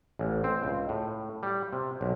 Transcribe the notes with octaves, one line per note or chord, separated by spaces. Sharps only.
A1
C4
C#2
A2
G3
C3
B1